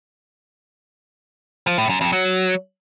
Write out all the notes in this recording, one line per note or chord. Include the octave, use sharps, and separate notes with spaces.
F3
A2
F#2
F2
F#3